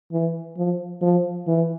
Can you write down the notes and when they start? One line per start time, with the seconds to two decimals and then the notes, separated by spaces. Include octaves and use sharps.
0.12 E3
0.57 F3
1.02 F3
1.47 E3